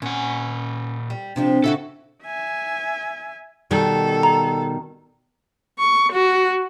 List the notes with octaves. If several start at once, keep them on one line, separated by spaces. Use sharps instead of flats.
A#2 C#4 F#5
G3
C3 F3 G3 D4
C#3 E4 F#4 A4
E5 G#5
B2 D#3 G3 A4
A#5
C#6
F#4